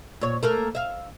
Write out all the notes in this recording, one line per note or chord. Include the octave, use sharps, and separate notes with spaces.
A#2 C#5
A3 A#3 A#4
E5 F5